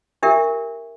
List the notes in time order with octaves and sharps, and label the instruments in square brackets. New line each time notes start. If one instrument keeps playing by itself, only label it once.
[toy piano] D4 G4 A#4 E5